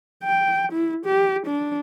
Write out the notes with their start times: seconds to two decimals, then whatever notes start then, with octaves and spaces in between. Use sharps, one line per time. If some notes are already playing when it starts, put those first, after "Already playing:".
0.24 G5
0.72 E4
1.06 G4
1.46 D4